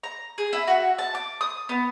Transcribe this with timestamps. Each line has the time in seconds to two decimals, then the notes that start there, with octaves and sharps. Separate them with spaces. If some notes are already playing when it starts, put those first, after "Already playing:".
0.03 A#5
0.38 G#4
0.53 E4
0.67 F#4
0.98 A5
1.15 D6
1.41 D#6
1.69 B3